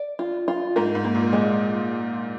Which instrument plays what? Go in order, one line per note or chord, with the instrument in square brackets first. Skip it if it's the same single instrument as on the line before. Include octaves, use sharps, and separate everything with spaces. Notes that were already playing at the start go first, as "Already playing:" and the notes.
Already playing: [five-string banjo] D5
F4
F4
[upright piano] G#2 [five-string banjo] A#4
[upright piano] G#2
[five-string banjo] A#3
[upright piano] A#2
[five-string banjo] G#3